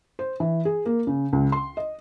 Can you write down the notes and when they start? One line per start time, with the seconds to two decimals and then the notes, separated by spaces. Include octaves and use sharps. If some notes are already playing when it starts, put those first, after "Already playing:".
0.19 C5
0.40 E3
0.65 G#4
0.86 A#3
1.07 C#3
1.33 C#2
1.52 C6
1.77 D#5